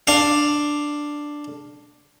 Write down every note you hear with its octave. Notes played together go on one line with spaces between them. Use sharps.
D4 F5